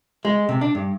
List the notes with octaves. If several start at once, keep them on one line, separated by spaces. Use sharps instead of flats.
G#3
C3
D4
G2